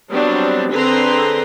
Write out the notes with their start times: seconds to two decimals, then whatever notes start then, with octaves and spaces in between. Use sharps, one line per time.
0.11 F#3 G3 B3 C4 D4
0.73 D3 C4 G#4 B4 A#5 C6